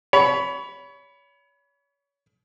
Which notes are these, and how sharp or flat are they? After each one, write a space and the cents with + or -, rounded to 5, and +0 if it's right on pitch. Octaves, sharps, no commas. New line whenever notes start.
C#5 +30 B5 +0